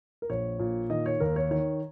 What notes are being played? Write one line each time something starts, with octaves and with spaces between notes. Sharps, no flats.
A#4
A#1 C#5
A#2
D#3 D#5
C#5
D#2 A#4
C#5
D#3 C#5